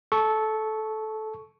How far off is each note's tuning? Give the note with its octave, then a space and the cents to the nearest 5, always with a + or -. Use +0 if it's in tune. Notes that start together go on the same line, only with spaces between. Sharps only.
A4 -15 C#6 +0